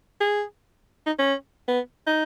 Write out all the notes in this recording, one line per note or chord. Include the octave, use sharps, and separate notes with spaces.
G#4
D#4
C#4
B3
D#4